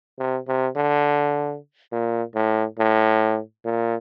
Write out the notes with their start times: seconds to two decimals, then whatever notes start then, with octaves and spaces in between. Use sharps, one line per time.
0.19 C3
0.48 C3
0.76 D3
1.92 A#2
2.35 A2
2.79 A2
3.65 A#2